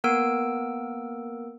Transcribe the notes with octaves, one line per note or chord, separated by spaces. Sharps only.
A#3 B3 A#4 E6 D7